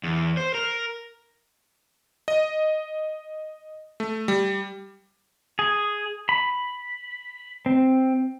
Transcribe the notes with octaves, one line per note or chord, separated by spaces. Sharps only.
E2
C5
A#4
D#5
A3
G3
G#4
B5
C4